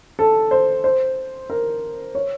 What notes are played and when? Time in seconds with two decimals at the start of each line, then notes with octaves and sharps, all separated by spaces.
0.19 A4
0.51 C5
0.84 C5
1.50 A#4
2.15 C#5